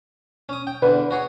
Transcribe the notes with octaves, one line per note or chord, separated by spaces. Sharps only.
C#4 D#6
G5
E2 D3 B4
F#4 G#4 C#5